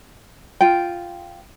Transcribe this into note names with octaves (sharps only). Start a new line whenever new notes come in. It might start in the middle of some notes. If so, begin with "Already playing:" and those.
F4 G5